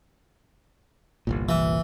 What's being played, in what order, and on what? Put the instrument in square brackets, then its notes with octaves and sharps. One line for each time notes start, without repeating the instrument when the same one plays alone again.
[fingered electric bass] G1 C2 A#2
[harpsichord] E3